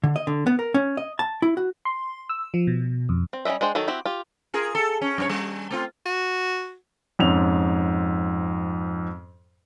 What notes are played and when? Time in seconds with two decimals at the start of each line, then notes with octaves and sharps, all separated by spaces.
0.04 D3
0.16 D#5
0.27 D3
0.47 B3
0.59 A#4
0.74 C#4
0.97 D#5
1.19 A5
1.42 E4
1.57 F#4
1.85 C6
2.29 E6
2.54 F3
2.67 B2
3.09 F2
3.33 C4
3.45 G3 C#4 B4 D#5 E5
3.61 G#3 D4 C5 G5
3.75 D#3 F#3 D#4 F#4 A4
3.88 C4 E4 F#4 G4
4.05 F4 G4
4.54 F4 G#4 A#4
4.75 A4
5.01 C#4
5.18 F#2 C#4 C#5
5.29 G3
5.71 A3 C4 F4
6.06 F#4
7.19 F2 G#2 C#4 F7